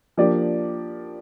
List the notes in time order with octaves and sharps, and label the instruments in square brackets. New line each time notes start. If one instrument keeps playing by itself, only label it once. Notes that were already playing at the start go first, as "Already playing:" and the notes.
[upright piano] F3 A#3 D4 G4 D5